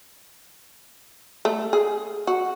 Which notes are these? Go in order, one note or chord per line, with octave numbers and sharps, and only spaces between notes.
A3
G#4
F#4